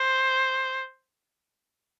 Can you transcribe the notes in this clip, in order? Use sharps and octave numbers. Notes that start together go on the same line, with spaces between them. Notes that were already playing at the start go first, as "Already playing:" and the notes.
Already playing: C5